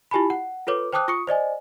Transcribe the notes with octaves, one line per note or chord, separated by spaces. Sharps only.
E4 F4 G4 G#5 A5 B5
F#5
F4 A4 B4 C#5 D6
C5 G5 A5 D6 D#6 F#6
F4 C#6 D#6 C#7
C5 D5 D#5 G#5